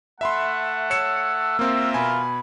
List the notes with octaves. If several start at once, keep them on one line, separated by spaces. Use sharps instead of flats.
A3 E5 F#5 A5 B5 C6
C#5 E6 C#7 E7
A#3 C4 F4 A#4 E5
B2 G#5 B5